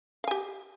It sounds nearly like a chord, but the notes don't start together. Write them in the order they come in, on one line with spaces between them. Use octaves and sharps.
F5 G#5 G4